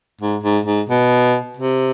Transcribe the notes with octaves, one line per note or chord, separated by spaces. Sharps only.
G#2
G#2
G#2
B2
C3